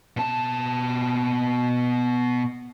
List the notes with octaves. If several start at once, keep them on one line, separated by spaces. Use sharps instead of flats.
B2 A5